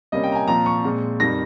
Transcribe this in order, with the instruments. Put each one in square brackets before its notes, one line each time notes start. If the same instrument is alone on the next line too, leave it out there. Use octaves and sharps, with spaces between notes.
[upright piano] C3 G3 A#3 C#4 D#5
G5
A#5
G#5
A#2 F3 C4 A#5
C#6
A#2 G#3 C4
F2 D#3 G3 A#6